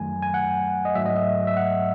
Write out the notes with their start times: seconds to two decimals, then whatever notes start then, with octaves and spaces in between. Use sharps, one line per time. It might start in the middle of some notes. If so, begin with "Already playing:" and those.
Already playing: F#2 D#3 F#3 A3 G#5
0.23 G#5
0.34 F#5
0.85 D#5
0.95 G#2 F#3 A3 E5
1.06 D#5
1.16 E5
1.47 E5
1.57 F#5